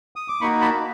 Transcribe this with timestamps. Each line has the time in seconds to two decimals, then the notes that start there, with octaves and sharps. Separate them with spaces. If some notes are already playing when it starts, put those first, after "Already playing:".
0.16 D#6
0.28 D6
0.41 A#3 D#4 F#4 B5 C#6
0.61 A5 B5